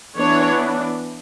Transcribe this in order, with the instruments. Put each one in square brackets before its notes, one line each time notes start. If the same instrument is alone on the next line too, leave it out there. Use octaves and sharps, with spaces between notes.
[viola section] E3 B3 D4 C#5